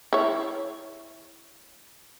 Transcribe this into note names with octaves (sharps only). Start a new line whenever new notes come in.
E4 C#5